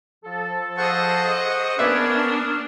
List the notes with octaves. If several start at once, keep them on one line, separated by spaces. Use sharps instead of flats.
F3 A4
G#4 C5 D#5 F#5 C#6
A#3 B3 C#4 D4 B4 D5 E5